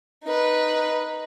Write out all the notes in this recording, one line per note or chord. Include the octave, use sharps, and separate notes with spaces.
D#4 B4